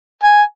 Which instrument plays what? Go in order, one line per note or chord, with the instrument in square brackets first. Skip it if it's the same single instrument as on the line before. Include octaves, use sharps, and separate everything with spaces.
[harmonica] G#5